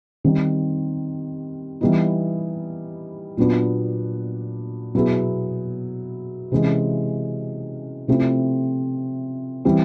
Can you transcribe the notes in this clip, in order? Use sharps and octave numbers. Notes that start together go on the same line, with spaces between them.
D#3 G3 C4
E3 G3 B3 D#4
A#2 F#3 B3 D4
B2 F#3 B3 E4 G#4
C3 E3 G#3 C#4
C3 F3 A3 C4 E4
E3 G3 C4 E4